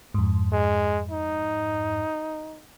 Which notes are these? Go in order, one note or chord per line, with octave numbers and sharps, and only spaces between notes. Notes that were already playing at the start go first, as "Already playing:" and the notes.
F2 G#2
G#3
D#4